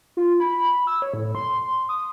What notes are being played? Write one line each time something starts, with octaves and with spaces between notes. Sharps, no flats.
F4
B5
E6
C#5
A2
C6
D#6